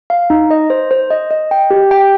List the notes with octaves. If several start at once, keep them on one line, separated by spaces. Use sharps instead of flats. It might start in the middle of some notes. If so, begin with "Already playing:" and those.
F5
D#4
D#5
C5
C5
D#5
D#5
G5
G4
G5